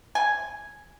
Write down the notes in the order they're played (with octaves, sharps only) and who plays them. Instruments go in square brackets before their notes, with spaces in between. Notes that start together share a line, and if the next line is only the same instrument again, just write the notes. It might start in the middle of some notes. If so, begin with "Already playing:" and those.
[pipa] G#5